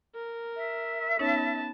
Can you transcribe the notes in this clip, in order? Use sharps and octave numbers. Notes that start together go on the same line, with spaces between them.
A#4
E5
B3 C#4 D#4 C#5 A5